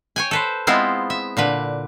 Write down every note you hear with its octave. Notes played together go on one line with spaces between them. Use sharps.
C#5 G5 G#5
A4 B4 C5
G#3 B3 C4 E4 F4
E5
A#2 D3 B4